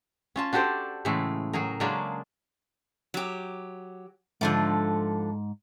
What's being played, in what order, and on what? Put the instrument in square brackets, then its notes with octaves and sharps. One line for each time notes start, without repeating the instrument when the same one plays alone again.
[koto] C#4 F4 A5
D4 F#4 G4 A4 C5 D5
A2 C#3 E3 G#3 A3
A2 F#3 G#4 A#4
C#3 F#3 G#3 A#3 C#4 D4
[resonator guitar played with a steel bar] F#3 G4
[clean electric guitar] G#2 [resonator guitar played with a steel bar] D3 F3 A3